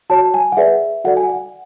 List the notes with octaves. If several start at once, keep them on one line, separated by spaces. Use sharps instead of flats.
F#4 C#5 A5
G#5
F#5
G#4 B4 D5 E5
F#4 A4 D5 F#5
G#5
F#5